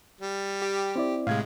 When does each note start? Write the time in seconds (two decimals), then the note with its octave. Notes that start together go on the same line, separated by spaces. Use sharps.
0.21 G3
0.62 G4
0.96 C4 E4 D5
1.27 A2 C3 G#3 F5 G#6